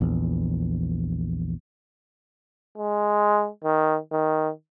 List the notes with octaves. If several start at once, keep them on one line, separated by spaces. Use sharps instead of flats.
A#1 E2
G#3
D#3
D#3